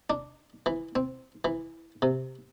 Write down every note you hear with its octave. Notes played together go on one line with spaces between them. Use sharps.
D4
E3
C4
E3
C3